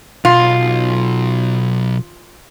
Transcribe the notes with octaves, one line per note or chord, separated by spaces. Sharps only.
B1 F4